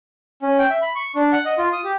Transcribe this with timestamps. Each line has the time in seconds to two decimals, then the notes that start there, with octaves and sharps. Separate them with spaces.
0.42 C#4
0.59 G5
0.70 E5
0.82 B5
0.95 C#6
1.16 D4
1.33 F#5
1.45 D#5
1.58 F4
1.73 D#6
1.84 G4